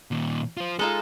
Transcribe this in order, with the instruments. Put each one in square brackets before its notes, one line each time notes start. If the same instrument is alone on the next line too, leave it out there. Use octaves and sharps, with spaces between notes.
[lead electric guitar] D#2 A#2
F4 C5
[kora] G#3 D#4 F4 [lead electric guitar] A4